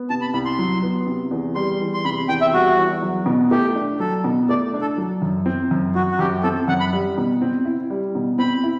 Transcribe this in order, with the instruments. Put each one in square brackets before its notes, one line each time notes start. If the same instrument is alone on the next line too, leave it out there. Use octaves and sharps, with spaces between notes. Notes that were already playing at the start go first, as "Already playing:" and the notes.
Already playing: [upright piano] B3
[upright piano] C3 [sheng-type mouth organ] A5
[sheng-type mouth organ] B5
[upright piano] C2 [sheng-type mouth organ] B5
[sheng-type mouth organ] C6
[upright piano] F#3
B3
C3
E2
[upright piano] G3 [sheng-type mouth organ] C6
[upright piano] E2
[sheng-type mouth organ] C6
[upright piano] C3 [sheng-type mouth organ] B5
[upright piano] E2 [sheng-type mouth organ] G5
[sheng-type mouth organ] E5
[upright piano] G3 [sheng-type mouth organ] F#4
[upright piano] E2
F#3
B2
[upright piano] A3 [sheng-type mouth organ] G4
[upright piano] D4
[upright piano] F#3 [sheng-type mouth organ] A4
[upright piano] B2
[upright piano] A3 [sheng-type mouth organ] D5
[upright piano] D4
[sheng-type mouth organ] A4
[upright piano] F#3
F#2
C4
F#2
[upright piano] F#3 [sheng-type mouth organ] F#4
[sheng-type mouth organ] F#4
[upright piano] F#2 [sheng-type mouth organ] G4
[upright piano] C4 [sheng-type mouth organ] A4
[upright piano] F#2 [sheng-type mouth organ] F#5
[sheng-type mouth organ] B5
[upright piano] G3
B2
C4
E4
G3
B2
[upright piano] C4 [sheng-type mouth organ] B5
[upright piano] E4